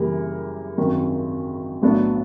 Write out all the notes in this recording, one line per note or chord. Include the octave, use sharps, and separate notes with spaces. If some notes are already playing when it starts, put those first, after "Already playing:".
Already playing: F#2 C#3 E3 G3 A#3
G#1 F#2 D#3 F#3
B1 A2 F#3 B3 D4